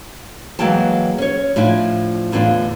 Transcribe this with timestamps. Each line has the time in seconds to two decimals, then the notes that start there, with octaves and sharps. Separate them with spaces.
0.59 E3 F#3 G#3 A#3 G5 A5
1.18 C#4 C#5
1.56 A2 F3 D4 E4
2.32 E2 A2 D3 D4 F4